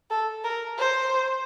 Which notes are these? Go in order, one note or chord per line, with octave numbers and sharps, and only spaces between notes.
A4
A#4
C5